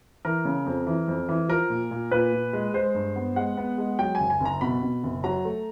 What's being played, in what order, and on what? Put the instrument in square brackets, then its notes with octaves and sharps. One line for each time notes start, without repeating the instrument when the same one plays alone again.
[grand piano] E3 A#4
C#3
F2
E3
F2
E3
F3 A#4
A#2
A#2
A#2 B4
A#2
G#3
G#3 C5
G2
B3
G#3 F#5
B3
G#3
F#3 G5
G#5
F#1
G#5
F#1
A#5
B2 B5
B2
F#1
F#3 A#5
A3